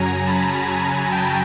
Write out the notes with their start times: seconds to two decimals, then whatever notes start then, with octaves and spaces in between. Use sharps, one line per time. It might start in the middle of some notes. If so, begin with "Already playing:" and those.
Already playing: F#2 C#3 F#3 G#5 A#5
0.27 A5 B5
0.69 G#5 A#5
1.12 G5 A5